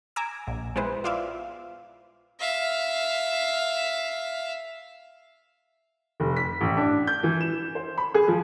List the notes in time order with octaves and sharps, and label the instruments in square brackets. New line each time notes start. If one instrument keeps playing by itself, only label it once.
[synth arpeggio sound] G#5 A#5 D6 E6
A#1
G#3 B3 E4 B4 C5
F4 C5 D5 E5 F5
[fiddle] E5 F5
[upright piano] F1
B6
A1
D4
G6
E3
E7
C5
B5
G#4
F3